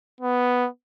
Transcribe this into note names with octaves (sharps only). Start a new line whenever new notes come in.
B3